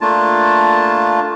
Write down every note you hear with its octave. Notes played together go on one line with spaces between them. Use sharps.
A3 A#3 D4 F4 A5